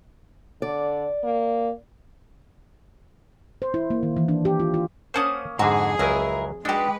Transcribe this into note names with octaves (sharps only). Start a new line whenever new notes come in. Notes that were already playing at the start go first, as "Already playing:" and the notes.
D3 D5
A#3
C5
E4
A#3
D#3
E3
D4
G4
F4
F4
A#3 C#4 C5 F#5 A5 D#6
F2 G#2 D3 F#4 G#4
C#2 F#3 E4 A#4 G#5
G#3 D4 D#4 F#4 G4 B4